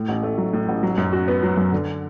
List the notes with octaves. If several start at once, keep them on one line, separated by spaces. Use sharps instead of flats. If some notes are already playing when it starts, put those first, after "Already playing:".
Already playing: A2
A1
A3
F#3
A2
A1
F#3
F#2
F#4
B3
F#3
F#2
D3